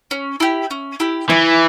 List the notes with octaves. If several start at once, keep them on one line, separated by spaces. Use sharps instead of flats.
C#4
E4 G4
C#4
E4 G4
E3 E4